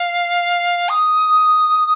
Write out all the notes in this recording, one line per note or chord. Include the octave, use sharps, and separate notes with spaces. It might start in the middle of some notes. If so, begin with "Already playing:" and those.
Already playing: F5
D#6